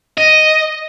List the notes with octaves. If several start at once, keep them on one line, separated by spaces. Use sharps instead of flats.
D#5